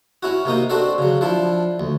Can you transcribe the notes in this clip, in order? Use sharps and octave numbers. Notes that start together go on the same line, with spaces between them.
C#4 E4 F#4
C3 A#3 D#4 D#6
C4 D4 F#4 A4 D5
C#3 F#3
F3 D4 E4
D2